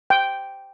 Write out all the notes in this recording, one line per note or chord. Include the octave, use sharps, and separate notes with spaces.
G5